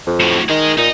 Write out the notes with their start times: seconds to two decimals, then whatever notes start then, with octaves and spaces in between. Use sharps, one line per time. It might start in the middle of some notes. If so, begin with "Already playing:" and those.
0.07 F2
0.20 A2 F#3
0.49 D#3 G#4 D#5
0.78 A#2 D#4 D#5